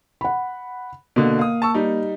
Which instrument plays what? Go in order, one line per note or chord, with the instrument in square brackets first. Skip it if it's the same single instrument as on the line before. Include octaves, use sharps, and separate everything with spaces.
[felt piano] F#5 B5
[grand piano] B2 D3 [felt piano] A#3
[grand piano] F5 D#6
A5 C#6 E6
G3 D#4